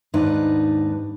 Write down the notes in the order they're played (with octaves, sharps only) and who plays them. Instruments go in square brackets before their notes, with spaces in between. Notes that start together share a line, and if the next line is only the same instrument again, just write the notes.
[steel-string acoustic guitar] D#2 G#2 D4 D#4 B4 D5